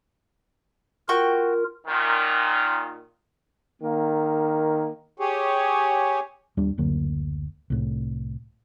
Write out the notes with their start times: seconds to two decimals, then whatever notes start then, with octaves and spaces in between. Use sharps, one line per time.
1.09 F4 F#4 A#4 G5 C#6
1.87 A#2 D#3
3.82 D#3 A#3
5.20 G4 G#4 C#5
6.57 D#2 G3 D4
6.78 F#1 D2 F#3 A#3
7.70 C2 A2